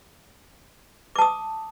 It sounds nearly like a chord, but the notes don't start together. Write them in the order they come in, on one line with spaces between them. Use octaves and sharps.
D6 A5 D#6